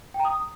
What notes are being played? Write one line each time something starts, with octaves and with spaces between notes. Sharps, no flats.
G5
A#5
D#6